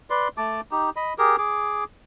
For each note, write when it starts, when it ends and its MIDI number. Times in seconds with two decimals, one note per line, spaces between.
0.10 0.28 71
0.10 0.28 74
0.10 0.28 84
0.37 0.61 57
0.37 0.61 81
0.37 0.61 86
0.71 0.90 63
0.71 0.90 67
0.96 1.13 75
0.96 1.13 83
1.18 1.36 67
1.18 1.36 68
1.18 1.36 70
1.38 1.84 68
1.38 1.84 86